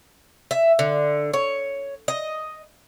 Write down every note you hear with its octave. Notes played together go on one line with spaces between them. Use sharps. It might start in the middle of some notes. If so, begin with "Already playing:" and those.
E5
D3
C#5
D#5